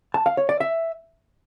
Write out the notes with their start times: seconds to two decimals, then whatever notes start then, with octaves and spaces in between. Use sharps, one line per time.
0.14 A5
0.26 F5
0.37 C#5
0.49 D5
0.60 E5